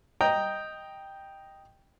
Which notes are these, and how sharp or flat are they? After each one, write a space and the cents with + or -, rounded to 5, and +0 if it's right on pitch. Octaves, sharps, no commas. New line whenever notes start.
D#5 +0 G5 +0 A#5 +0